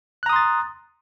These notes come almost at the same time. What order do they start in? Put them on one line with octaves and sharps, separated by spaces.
F#6 A#5 D#6 C6 A6